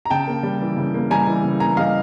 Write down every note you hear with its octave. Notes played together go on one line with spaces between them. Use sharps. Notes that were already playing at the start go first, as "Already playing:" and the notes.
A#5
C#3 G5 A5
A#3
G3
E3
C#3
A#3
G3 G#5 A#5
E3
C#3
A#3 G#5 A#5
G3 D#5 F5